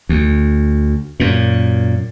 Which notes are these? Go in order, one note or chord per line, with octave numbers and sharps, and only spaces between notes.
D2
F#2 A#2